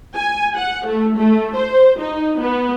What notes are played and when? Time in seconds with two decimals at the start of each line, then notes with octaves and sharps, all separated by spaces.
0.15 G#5
0.56 F#5
0.85 A3
1.17 A3
1.54 C5
1.98 D#4
2.39 B3